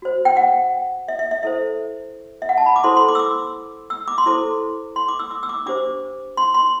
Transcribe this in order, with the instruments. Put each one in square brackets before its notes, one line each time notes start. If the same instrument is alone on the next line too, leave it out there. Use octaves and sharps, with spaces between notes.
[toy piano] F#4 C5
G5
F#5
E5
E5
E5
E4 A4 C5 E5
E5
F#5
A5
B5
D6
E4 A4 C5 C6
C6
D6
E6
D6
E6
D6
C6
E4 A4 C5 D6
C6
D6
E6
D6
E6
D6
D4 G4 C5 D6
C6
C6